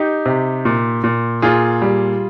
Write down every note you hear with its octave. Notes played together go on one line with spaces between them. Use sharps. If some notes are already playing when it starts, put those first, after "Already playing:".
Already playing: D#4 G4
C3
A#2
A#2
A#2 F4 G#4
G3